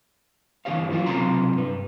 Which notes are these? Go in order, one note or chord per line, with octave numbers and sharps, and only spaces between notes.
G2 E3 F3 G4 C#5 F5
E3 F#3 C#4 F4
B1 C3 F#3 F4 A#5 C6
G2 B4